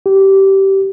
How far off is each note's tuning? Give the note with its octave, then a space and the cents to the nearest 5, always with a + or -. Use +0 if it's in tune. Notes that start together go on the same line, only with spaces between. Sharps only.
G4 -15